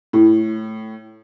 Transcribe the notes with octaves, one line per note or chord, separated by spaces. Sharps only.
A2